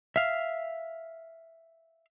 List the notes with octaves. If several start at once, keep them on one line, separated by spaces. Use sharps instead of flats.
E5 F5